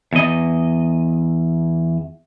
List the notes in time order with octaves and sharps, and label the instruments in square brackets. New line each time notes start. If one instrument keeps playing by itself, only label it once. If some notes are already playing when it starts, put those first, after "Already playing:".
[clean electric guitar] E2 D#5